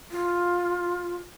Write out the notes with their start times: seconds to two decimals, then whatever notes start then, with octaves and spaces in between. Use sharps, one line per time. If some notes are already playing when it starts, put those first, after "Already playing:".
0.12 F4